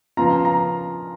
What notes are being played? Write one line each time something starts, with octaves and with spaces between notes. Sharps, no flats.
C#3 F3 B3 F4 A#5
A#5